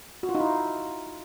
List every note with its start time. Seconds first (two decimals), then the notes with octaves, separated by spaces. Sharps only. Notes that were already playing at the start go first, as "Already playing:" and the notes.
0.23 F#4
0.29 F4
0.35 D#4
0.40 E4